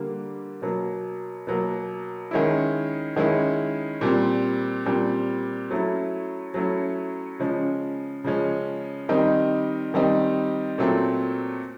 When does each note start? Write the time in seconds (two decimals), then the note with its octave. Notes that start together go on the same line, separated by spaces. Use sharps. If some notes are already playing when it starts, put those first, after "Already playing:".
Already playing: D3 G3 A#3
0.62 B2 F#3 A#3
1.47 B2 F#3 A#3
2.31 D#3 G#3 C#4 E4
3.16 D#3 G#3 C#4 E4
4.01 A#2 G3 C4
4.86 A#2 G3 C4
5.71 F#3 A3 C#4 E4
6.54 F#3 A3 C#4 E4
7.39 C#3 F3 G#3 C#4
8.24 C#3 F3 G#3 C#4
9.09 D#3 G3 C4 D#4
9.94 D#3 G3 C4 D#4
10.78 A#2 F#3 A3 C4